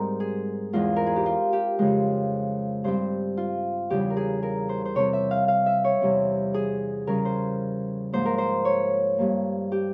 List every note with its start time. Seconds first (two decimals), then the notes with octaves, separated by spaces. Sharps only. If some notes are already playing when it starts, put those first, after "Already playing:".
Already playing: G#2 G3 C4 A#4
0.20 G#4
0.73 E2 E3 G#3 C4 F4
0.96 A#4
1.07 G#4
1.16 G4
1.26 F4
1.53 G4
1.79 F2 C#3 F3 G#3
2.84 G2 G3 C4 C5
3.37 F4
3.90 E2 C#3 G3 G4
4.10 A#4
4.17 G#4
4.43 A#4
4.69 C5
4.85 C5
4.95 C3 G3 C4 C#5
5.13 E5
5.31 F5
5.48 F5
5.66 E5
5.84 C#5
6.01 E2 C3 G3 C4
6.54 G#4
7.07 C#3 G3 C#4 A#4
7.25 C5
8.12 G#2 F3 A#3 C5
8.25 A#4
8.38 C5
8.65 C#5
9.18 G2 G3 A#3
9.72 G4